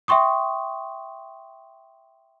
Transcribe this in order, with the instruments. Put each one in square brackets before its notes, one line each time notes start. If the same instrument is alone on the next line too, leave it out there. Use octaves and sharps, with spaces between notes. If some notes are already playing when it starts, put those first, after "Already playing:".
[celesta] E5 G5 C6 C#6 D#6